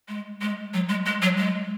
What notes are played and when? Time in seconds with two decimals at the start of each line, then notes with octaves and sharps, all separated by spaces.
0.09 G#3
0.42 G#3
0.74 F#3
0.89 G#3
1.06 G#3
1.22 F#3
1.38 G#3